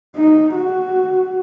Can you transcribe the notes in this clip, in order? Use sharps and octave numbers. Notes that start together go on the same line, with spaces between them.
D#4
F#4